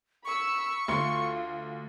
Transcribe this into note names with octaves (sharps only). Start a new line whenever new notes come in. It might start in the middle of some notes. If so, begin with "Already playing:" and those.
B5 C#6 E6
D2 F4 C6 C#7